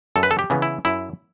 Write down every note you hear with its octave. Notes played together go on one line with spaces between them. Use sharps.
F#2 A4
B4
A4
G4
C#3 E3 B3
E4
F#2 E4